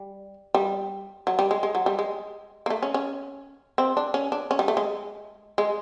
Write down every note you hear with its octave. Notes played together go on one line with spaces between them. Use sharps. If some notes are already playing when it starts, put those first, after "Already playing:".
Already playing: G3
G3
F#3
G3
G#3
G#3
F#3
G3
G#3
A#3
A3
C#4
C#4
C4
D4
C#4
D4
C#4
G3
A3
G#3
G#3